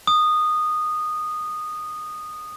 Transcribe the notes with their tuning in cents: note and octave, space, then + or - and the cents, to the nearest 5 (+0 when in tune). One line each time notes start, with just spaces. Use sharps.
D#6 -15